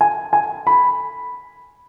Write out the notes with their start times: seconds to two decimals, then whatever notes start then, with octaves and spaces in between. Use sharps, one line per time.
0.01 G#5
0.33 G#5
0.67 B5